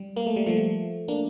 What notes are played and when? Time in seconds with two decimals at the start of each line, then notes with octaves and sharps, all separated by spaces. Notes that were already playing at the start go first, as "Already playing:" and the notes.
Already playing: G3
0.16 A#3
0.26 A3
0.36 G3
0.46 F3 A3
1.08 A#3 D4